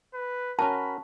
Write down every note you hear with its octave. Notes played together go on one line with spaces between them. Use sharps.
B4
C#4 F#4 A#4 A5 B5